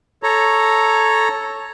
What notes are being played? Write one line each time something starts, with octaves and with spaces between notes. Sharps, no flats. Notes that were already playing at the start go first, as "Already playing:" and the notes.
A4 C#5 A#5